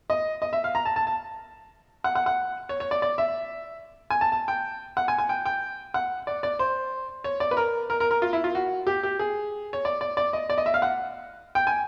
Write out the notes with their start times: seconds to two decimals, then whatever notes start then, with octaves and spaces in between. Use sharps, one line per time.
0.10 D#5
0.42 D#5
0.53 E5
0.64 F5
0.75 A#5
0.85 A5
0.96 A5
1.07 A5
2.04 F#5
2.15 F#5
2.26 F#5
2.69 C#5
2.80 C#5
2.91 D5
3.02 D5
3.18 E5
4.10 G#5
4.21 A5
4.32 A5
4.48 G5
4.97 F#5
5.08 G#5
5.18 G#5
5.29 G5
5.46 G5
5.94 F#5
6.27 D5
6.43 D5
6.59 C5
7.24 C#5
7.40 D5
7.51 B4
7.57 A#4
7.90 A#4
8.00 A#4
8.11 A#4
8.22 F4
8.33 E4
8.44 F4
8.55 F#4
8.87 G4
9.03 G4
9.19 G#4
9.73 C#5
9.85 D5
10.01 D5
10.17 D5
10.33 D#5
10.50 D5
10.58 D#5
10.66 E5
10.74 F5
10.82 F#5
11.55 G5
11.67 G#5